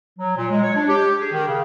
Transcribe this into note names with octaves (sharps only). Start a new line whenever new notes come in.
F#3
A#2
G#3
C#5
D4
G4
G#4
D#3
C#3